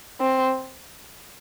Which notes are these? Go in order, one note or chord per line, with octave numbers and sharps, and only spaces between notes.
C4